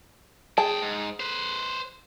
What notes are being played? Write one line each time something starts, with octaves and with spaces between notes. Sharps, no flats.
F#2 G#4 G5 A5
G#2
B4 C5